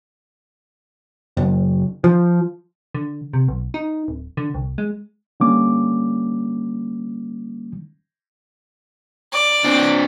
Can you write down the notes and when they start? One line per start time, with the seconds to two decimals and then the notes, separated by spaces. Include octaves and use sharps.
1.37 F#1
2.04 F3
2.95 D3
3.33 C3
3.48 B1
3.74 D#4
4.08 D1
4.37 D3
4.54 C2
4.78 G#3
5.40 D3 G3 A#3 C#4 D6
9.32 D5
9.64 C4 D4